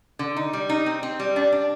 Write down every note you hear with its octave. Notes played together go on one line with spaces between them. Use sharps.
D3
D#4
G3
D#4
C4
C4
G3
D4
D4